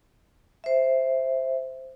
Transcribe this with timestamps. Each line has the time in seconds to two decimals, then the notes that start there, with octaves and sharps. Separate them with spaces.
0.64 C5 E5